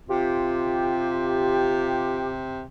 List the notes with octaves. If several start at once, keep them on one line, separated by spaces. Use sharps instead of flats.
C3 F4 G4